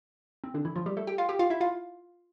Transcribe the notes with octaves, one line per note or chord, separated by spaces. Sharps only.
C4
D3 D4
E3 E4
F3 F4
G3 G4
A3 A4
G4 G5
F4 F5
G4 G5
F4 F5
E4 E5
F4 F5